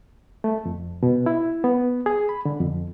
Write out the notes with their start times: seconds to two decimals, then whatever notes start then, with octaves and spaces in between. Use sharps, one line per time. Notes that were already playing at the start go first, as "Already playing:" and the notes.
0.44 A3
0.65 F2
1.03 B2
1.26 E4
1.64 B3
2.06 G#4
2.29 B5
2.45 D3
2.60 F2